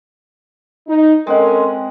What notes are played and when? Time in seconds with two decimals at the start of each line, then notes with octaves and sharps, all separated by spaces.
0.88 D#4
1.27 G#3 C4 C#4 A4 A#4 F#5